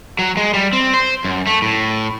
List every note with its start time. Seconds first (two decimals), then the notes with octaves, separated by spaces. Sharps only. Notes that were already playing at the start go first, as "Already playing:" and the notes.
0.19 F#3
0.37 G#3
0.54 G3
0.73 C4
0.94 C5
1.25 F#2
1.47 A3
1.62 A2